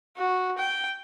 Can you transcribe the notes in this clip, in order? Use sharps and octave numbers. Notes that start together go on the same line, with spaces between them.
F#4
G5